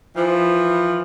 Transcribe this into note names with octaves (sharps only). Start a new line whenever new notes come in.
E3 F3